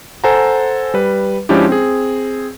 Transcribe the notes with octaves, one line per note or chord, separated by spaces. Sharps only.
A4 C5 F#5 G#5 A#5
G3 B4
F3 G#3 C#4 D4 E4 G4
C4 G#4